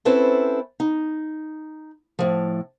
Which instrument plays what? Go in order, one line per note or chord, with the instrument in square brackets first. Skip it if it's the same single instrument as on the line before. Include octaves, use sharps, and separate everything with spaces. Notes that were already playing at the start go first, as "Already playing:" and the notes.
[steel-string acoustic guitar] C4 C#4 E4 A4 B4 C5
D#4
A2 F3